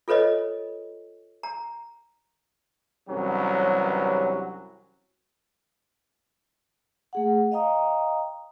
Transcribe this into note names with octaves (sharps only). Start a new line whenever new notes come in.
F4 A4 B4 C#5 D#5
A#5
C2 G2 E3 F#3 C#4 G4
A3 G#4 F#5
D#5 F5 G5 A#5 D#6